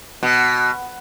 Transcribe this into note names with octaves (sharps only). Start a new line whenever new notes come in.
B2